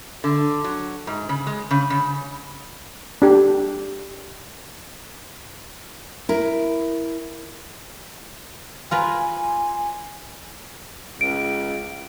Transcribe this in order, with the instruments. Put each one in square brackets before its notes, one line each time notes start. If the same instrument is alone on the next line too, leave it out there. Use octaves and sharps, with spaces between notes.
[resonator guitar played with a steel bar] D3
F#3
G#2
C#3
G#3
C#3
C#3
[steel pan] D4 G4
[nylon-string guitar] E4 A#4
[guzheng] F4 A#4 B4 [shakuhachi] G#5
[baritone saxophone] C#2 [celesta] D7